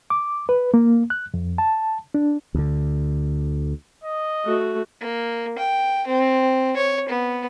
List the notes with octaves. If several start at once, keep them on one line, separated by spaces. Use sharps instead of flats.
D6
B4
A#3
F#6
F2
A5
D4
D2 D3
D#5
A3 F#4
A#3
G5
C4
C#5
B3